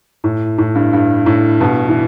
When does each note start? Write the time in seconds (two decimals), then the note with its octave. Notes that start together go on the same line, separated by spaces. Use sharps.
0.24 A2
0.58 A2
0.75 G2
0.93 G2
1.26 A2
1.61 G2 B2
1.89 E3